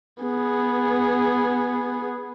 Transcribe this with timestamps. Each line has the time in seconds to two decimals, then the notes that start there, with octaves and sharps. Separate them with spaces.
0.23 B3 G#4